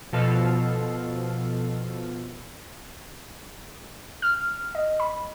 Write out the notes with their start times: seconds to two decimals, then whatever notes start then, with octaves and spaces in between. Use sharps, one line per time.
0.13 B2 F3 A4 F5
4.22 F6
4.75 D#5
5.00 B5